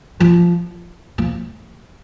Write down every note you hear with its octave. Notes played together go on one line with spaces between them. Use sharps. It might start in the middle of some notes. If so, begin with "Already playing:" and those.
F3
F3